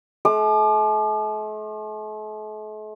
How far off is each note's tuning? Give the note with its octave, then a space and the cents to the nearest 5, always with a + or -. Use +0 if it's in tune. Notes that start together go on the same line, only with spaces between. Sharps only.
A3 -45 D6 +40